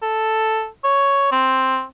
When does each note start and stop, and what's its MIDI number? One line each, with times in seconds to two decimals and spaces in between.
0.03 0.67 69
0.84 1.28 73
1.32 1.83 60